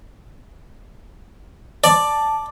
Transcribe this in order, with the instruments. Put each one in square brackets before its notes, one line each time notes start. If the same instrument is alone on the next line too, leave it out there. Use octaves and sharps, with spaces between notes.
[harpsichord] D5 [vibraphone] A5